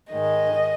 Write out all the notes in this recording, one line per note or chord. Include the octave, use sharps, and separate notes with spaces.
G#2 D#3 G#3 D#5